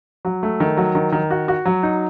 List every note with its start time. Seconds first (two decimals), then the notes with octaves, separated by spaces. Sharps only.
0.25 F#3
0.43 A3
0.60 D#3
0.77 F#3
0.95 D#3
1.12 D#3
1.30 F#4
1.48 F#4
1.65 F#3
1.83 D#4